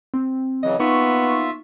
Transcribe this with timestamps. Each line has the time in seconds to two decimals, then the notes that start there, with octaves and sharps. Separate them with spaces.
0.14 C4
0.63 C#3 E3 F#3 D#5
0.80 A#3 B3 D#4 F4 E5 C#6